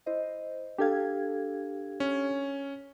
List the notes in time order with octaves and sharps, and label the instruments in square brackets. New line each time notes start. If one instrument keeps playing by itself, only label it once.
[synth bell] E4 C5 D#5
[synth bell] D4 A4 G#6 [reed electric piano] G4 F5
[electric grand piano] C#4